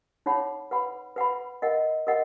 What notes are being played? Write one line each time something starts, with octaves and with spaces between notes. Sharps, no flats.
D#4 G#4 C#5 F#5 B5
B4 F#5 B5
B4 F#5 B5
A#4 D#5 F#5
A#4 D#5 F#5